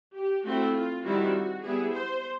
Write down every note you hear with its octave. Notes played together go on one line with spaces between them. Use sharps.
G4
A3 C4 E4 F#4
F4
D#3 G3 C4 E4 F#4
G3 B3 E4 G#4
C5